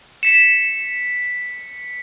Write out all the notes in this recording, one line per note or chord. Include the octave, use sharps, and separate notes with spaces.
B6 C#7 E7